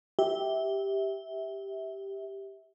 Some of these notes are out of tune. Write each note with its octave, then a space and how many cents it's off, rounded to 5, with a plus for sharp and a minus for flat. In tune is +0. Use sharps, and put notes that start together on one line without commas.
G4 +0 E5 -20